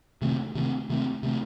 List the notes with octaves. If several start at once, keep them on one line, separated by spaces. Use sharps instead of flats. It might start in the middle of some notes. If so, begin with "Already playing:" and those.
C3 D#3 A3 C4
C3 D#3 A3 C4
C3 D#3 A3 C4
C3 D#3 A3 C4